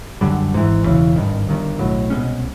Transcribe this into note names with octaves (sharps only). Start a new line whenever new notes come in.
F#2 D3 G3
G#1 G#2 E3
E1 D#2 C#3 E3
G#1 G2 D#3
G1 G2 D#3
B1 A2 F#3
C2 B2 G#3 C#4